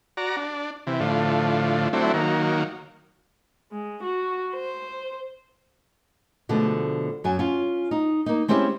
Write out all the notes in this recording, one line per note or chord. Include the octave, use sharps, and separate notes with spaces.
F#4 D5 A#5
D4
C3 E3
A2 D3 F3
F#3 A3 C4 D4 E4
D#3 F#3 A#3
G#3
F#4
C5
B2 D3 F3 G#3 A3
F#2 F#3 G#5
C#4 F4
D#4
A#3 D#4
G#3 C4 C#4 E4 G4 E5